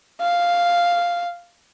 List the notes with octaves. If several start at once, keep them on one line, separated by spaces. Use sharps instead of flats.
F5